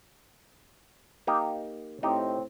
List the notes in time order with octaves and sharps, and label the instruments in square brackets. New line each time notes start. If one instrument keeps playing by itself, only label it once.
[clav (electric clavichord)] A#3 D#4 G4
[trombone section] A2 C4 [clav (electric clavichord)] D#4 G4